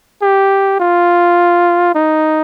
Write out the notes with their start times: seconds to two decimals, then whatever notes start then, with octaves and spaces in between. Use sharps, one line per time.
0.22 G4
0.80 F4
1.95 D#4